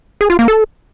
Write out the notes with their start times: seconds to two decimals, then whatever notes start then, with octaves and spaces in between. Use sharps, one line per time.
0.21 G#4
0.30 F4
0.39 A#3
0.48 A4